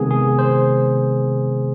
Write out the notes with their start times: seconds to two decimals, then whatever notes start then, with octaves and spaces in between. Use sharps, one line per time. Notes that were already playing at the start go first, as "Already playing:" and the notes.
Already playing: C3 D#3 G#3 B3 G#4
0.11 G#4
0.39 C5